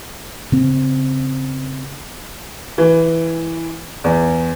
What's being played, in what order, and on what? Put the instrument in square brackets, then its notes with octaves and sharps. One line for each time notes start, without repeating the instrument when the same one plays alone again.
[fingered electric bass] C#3 C4
[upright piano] E3
E2